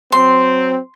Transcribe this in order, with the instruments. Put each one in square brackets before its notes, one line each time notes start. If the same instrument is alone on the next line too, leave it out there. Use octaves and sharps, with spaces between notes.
[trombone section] F#3 C4 [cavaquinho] C6